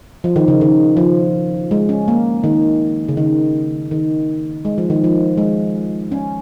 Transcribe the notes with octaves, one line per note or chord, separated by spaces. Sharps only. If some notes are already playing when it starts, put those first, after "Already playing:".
F3
D#3
C#3
D#3
F3
G#3
C#4
A#3
D#3
C#3
D#3
D#3
G#3
F3
D#3
F3
G#3
C#4